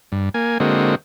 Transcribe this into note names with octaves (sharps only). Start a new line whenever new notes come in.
G2
A#3 G#5
D3 G#3 A#3 C4 F#4 D#5